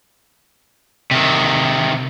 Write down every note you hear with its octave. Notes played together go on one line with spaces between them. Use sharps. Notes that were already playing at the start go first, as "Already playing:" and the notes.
C3 D#3